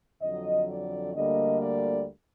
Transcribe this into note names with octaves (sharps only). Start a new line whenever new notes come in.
F2 D3 F#3 D#5
D5
D2 D3 G3 A#3 D#5
D5